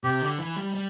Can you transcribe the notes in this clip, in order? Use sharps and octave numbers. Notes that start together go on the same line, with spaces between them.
C3 G4
D3
E3
G3
G3